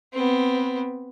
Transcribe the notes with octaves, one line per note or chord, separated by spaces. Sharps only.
B3 C4